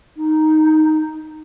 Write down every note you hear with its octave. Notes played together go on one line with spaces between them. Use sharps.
D#4